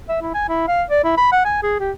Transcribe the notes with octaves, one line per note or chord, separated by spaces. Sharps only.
E5
E4
G#5
E4
F5
D5
E4
B5
F#5
G#5
G#4
G4